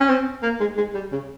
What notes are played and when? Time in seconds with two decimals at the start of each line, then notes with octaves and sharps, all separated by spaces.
0.01 C#4
0.09 C4
0.43 A#3
0.60 G#3
0.77 G#3
0.94 G3
1.12 C#3